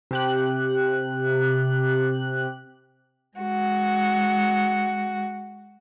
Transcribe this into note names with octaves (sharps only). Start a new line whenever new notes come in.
C3 G4 F#6
G#3 F#4